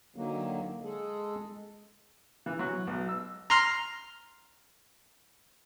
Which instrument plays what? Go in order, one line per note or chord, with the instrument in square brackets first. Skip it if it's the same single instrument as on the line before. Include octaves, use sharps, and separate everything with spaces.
[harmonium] D3 D#3 F#3 A#3
G#3 G#4 A4
[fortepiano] E3
F#3
B1
E6
[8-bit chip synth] A#5 C6 F6